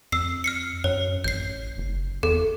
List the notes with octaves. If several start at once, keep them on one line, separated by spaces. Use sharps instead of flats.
F2 E6 C7
F6 C7 C#7
F#2 C#5
A1 G6 C7
F#1
E2 A4